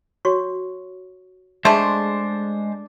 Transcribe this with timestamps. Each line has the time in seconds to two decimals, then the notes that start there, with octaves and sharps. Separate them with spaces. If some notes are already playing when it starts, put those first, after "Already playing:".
0.25 F#4 C#5 C#6
1.65 G#3 A3 D4 G#4 C5 A5 C6